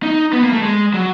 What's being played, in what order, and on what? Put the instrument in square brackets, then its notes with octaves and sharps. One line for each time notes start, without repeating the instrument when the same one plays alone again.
[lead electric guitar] D#4
B3
A#3
A3
G#3
F#3